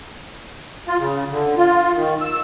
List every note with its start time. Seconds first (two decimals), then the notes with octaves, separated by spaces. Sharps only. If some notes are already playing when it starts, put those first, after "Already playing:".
0.88 F4
0.99 C#3
1.31 D3
1.58 F4
1.94 D#3
2.21 E6